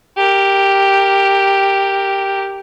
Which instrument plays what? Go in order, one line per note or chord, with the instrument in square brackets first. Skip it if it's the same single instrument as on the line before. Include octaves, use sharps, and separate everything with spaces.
[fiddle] G4 A#4